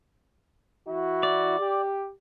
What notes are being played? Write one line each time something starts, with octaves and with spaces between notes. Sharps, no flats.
E3 E4 F#4
D5
G4